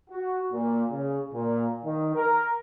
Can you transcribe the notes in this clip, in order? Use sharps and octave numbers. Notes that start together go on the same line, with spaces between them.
F#4
A#2
C#3
A#2
D#3
A#4